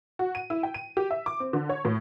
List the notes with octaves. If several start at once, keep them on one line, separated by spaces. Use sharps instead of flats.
F#4
D#7
E4
G5
D#7
G4
E5
D6
C4
D3
C#5
A2